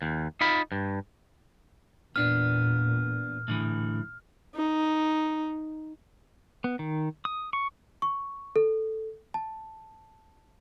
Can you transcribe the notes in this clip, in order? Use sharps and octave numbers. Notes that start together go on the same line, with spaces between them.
D#2
D#4 F4 B5
G2
E2 A#2 B3 D4 F6
A2 D3 E3
D#4
B3
D#3
D#6
C#6
C#6
A4
A5